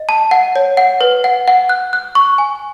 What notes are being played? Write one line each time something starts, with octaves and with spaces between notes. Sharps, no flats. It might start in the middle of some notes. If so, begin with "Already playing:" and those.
Already playing: D#5
A5
F#5
C#5
F#5
B4
F#5
F#5
F#6
F#6
C#6
G#5